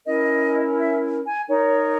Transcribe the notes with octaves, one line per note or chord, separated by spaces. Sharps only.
C#4 E4 A#4 D#5
E5
G#5
D#4 A#4 C#5